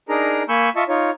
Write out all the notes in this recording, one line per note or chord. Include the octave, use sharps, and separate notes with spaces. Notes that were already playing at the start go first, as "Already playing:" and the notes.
D4 D#4 G#4 A#4 A#5
A#3 G#5 B5 C#6 E6 G6
F4 D#5 E5 A5 C#6
D#4 F4 C#5